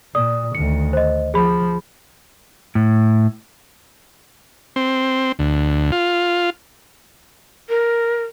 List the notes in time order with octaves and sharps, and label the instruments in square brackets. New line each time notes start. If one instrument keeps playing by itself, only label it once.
[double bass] A#2 [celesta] D5 D#6
[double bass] D2 D#3 [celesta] C#7
[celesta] C5 D#5
[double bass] F3 [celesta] G#4 B5
[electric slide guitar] A2
[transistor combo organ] C4
D2
F4
[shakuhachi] A#4